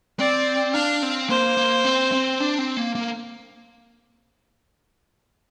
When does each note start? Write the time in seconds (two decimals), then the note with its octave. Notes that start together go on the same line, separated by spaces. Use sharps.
0.19 C4 D5
0.74 D4 F5
1.02 C4
1.29 A#3 C5
1.57 A#3
1.85 C4
2.12 C4
2.40 D4
2.58 C4
2.77 A#3
2.95 A#3